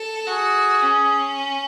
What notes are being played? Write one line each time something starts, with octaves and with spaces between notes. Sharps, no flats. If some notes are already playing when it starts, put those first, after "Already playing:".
Already playing: A4
F#4 G#4
C#4